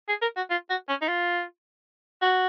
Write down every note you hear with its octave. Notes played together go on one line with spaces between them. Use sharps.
G#4
A#4
F#4
F4
F#4
C#4
D#4
F4
F#4